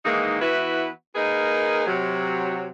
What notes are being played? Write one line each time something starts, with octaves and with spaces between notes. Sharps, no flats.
D#3 E3 G#3 A#3 D#4
E3 B3 E4 F#4 B4
A#3 D#4 G#4 A#4 B4
C3 F#3